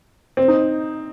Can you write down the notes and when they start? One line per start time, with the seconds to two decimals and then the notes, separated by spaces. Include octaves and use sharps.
0.37 C4
0.48 D#4